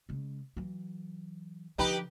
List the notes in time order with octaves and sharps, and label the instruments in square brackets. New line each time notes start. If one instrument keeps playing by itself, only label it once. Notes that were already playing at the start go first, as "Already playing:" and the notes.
[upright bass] C#3 G#3
E3 F#3
[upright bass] D3 F3 [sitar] D#4 G4 B4